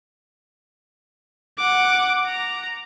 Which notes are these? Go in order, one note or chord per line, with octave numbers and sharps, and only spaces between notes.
F#5 D6
A#5